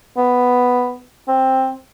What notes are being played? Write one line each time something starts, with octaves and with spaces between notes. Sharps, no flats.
B3
C4